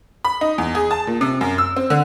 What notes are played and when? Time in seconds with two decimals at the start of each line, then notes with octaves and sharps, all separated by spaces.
0.25 B5
0.41 D#4
0.58 E2
0.75 G#4
0.91 A5
1.07 A#2
1.21 C3
1.41 F#2
1.58 E6
1.76 C4
1.90 D3